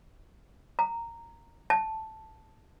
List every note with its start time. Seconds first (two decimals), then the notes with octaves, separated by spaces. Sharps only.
0.79 A#5
1.70 A5